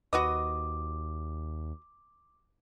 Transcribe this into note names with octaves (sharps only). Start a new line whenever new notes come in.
D#2 F#4 B4 D#5 D6